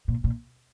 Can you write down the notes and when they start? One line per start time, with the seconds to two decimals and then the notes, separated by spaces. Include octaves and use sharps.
0.08 A#2
0.24 A#2